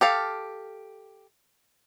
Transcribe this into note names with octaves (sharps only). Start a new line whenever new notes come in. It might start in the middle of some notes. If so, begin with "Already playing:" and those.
G4 A4 F5